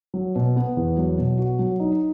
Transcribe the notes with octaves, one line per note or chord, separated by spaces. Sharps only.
F#3
B2
B3
E2
F#3
B2
F#4
F#3
D#4